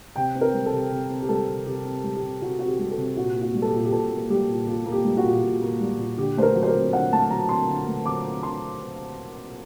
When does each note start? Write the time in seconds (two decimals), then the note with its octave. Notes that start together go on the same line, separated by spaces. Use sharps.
0.16 C3 G5
0.35 C4
0.41 A#4
0.54 G3
0.66 A4
0.73 C3
0.91 C3
1.10 C4
1.22 G4
1.29 G3 A4
1.48 C3
1.66 C3 G4
1.85 C4
2.04 G3
2.16 G4
2.22 C3
2.41 C3 F#4
2.59 C4 F#4
2.67 G4
2.79 G3 G4
2.91 A4
2.98 C3
3.17 A#2 F#4
3.36 A#3
3.42 F#4
3.54 G3
3.62 A4
3.67 G4
3.73 A#2
3.85 G4
3.92 A#2 A4
4.12 A#3
4.30 G3 G4
4.49 A#2
4.67 A#2 G4
4.86 A#3
4.92 G4
5.05 G3
5.17 F#4
5.24 A#2
5.43 A#2
5.61 A#3
5.81 G3
5.98 A#2
6.17 D3 G4
6.37 A3 C5
6.42 A#4
6.55 F#3
6.63 C5
6.67 A#4
6.75 C4
6.93 D3 F#5
7.12 A3 A5
7.30 F#3 A#5
7.49 C4 C6
7.68 D3
7.87 A3
8.06 F#3 D6
8.25 C4
8.43 D3 C6